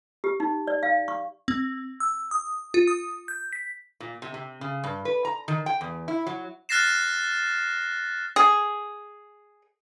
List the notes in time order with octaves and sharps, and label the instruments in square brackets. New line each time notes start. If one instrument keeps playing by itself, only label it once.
[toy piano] G4
D#4
D5
F5
C#6
[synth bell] C4
E6
D#6
F4
D#6
G6
B6
[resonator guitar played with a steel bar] A#2
C3
C3
C#3
G2
B4
A#5
D#3
G5
E2
E4
F#3
[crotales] F6 F#6 A6 A#6 C7 E7
[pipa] G#4